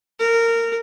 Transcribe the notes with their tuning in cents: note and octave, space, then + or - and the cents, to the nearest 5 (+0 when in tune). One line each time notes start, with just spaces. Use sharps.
A#4 -20